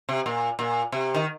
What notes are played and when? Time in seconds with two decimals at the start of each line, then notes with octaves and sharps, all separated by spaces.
0.09 C3
0.26 A#2
0.59 A#2
0.92 C3
1.14 D#3